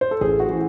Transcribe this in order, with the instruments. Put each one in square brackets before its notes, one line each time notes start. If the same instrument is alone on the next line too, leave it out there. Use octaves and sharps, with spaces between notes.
[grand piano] C5
A4
A1 G#4
F#4
E3